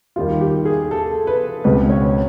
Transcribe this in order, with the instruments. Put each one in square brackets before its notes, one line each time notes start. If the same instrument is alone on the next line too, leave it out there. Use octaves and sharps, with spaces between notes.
[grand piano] D#2 D#3 G3 A#3 [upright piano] F4
[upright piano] G4
G#4
A4
B4
[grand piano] C#2 B2 G#3 C4 [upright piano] B4
[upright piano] C#5